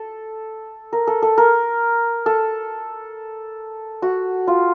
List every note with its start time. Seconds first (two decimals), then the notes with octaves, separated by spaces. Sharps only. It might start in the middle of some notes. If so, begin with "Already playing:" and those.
Already playing: A4
0.93 A#4
1.07 A4
1.22 A4
1.38 A#4
2.26 A4
4.02 F#4
4.48 F4